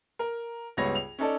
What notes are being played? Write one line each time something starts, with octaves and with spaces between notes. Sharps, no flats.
A#4
C#2 G2 B3 C#5 A#6
F7
C#4 D#4 A4 D5